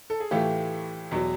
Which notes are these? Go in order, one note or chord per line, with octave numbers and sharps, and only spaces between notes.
A4
G#4
A2 E3 A3 F4 G4
E2 B2 F#3